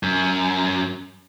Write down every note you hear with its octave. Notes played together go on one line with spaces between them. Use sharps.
F#2